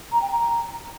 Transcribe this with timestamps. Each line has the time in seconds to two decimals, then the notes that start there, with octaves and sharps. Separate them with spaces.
0.12 A#5
0.22 G5
0.32 A#5